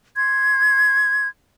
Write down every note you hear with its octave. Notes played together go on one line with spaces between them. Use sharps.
C6 G#6